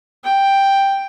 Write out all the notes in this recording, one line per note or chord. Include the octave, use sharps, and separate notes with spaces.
G5